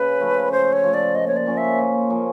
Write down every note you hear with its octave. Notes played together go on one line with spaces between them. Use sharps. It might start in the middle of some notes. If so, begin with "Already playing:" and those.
Already playing: C#3 B4
F3 A3
C#3 C5
C#5
F3 A3
D5
A#2 D#5
C#5
D5
F3 A#3 C#4
E5
A#2
F3 A#3 C#4